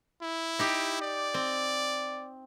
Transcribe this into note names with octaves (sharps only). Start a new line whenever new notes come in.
E4
D#4 G4
D5
C4